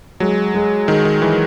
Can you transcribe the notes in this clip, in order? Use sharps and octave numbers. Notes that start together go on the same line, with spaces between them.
F#3 G#3
G#3
D#3 G#3
D#3
E3 G#3